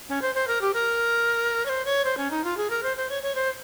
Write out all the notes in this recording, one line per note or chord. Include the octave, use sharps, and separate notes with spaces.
C#4
C5
C5
A#4
G4
A#4
C#5
C5
C#5
C5
C#4
D#4
F4
G#4
A#4
C5
C5
C#5
C#5
C5